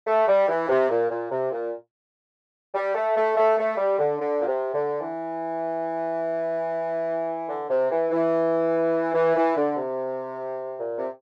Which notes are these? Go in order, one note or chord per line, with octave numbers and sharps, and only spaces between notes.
A3
G3
E3
C3
A#2
A#2
C3
A#2
G3
A3
A3
A3
A3
G3
D3
D3
A#2
C3
D3
E3
D3
C3
E3
E3
E3
E3
D3
C3
A#2
C3